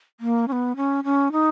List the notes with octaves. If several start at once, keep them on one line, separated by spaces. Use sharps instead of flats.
A#3
C#4
B3
C#4
C#4
D#4